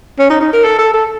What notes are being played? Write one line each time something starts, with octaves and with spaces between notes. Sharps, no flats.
C#4
D#4
D#4
A#4
A4
A4
A4